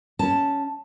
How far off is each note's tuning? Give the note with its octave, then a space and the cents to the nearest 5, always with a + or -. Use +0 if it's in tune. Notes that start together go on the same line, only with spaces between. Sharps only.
C#4 +15 A5 +0